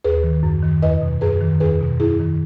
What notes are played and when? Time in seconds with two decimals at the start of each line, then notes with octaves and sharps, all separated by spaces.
0.04 D#2 G#4 B4
0.24 D#3
0.43 F#2
0.63 D#3
0.82 E2 B4 D#5
1.02 B2
1.21 F#2 G#4 B4
1.41 D#3
1.60 E2 G#4 B4
1.80 B2
1.99 F#2 E4 G#4
2.19 D#3